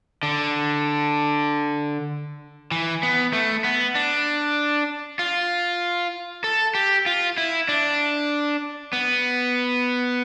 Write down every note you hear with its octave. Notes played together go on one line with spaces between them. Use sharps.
D3
E3
B3
A3
B3
D4
F4
A4
G4
F4
E4
D4
B3